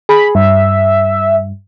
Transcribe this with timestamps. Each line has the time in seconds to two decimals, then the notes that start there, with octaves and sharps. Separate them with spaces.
0.09 G#4 B5
0.35 G2 E5